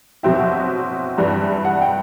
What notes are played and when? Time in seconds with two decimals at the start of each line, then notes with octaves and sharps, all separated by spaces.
0.23 B2 F#3 C4 E4 G5
0.39 F#5
0.54 E5
1.18 G2 E3 G3
1.65 F#5
1.81 G5